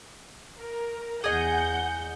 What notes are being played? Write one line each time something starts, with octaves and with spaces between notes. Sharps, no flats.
A#4
E2 G#4 D#5 F#5 G6